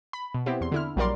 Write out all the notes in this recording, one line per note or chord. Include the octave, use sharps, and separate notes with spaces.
B5
B2
B3 C4 E4 G4
E2 C6
D3 E4 F6
A#1 F#3 G3 A#4 D5 C6